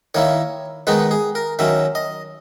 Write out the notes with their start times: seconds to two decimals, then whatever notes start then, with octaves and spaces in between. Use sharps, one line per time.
0.14 D#3 A#3 E4 C#5
0.87 D#3 G#3 B3 D#4 B4
1.11 G#4
1.35 A#4
1.59 D#3 F#3 C#4 E5
1.95 D#5